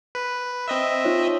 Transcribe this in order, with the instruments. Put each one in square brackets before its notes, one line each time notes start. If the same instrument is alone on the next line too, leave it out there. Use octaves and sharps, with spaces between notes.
[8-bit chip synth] B4
C4 D#5 E5
[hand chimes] D#4 F4 C#5